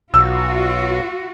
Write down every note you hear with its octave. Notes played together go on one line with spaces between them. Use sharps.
B1 F4 F#4 E6